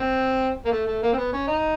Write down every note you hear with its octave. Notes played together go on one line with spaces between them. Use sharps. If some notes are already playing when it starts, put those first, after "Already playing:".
Already playing: C4
A#3
A3
A3
A#3
C4
B3
C#4
D#4